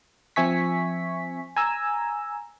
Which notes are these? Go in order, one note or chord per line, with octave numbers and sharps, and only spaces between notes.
F3 C4 E5 G#5 C#6 B6
G#5 A#5 E6